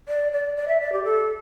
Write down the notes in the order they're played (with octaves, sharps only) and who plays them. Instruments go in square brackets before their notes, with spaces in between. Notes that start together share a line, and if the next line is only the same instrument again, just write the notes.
[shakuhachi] D5
D5
D5
E5
D5
G4
A4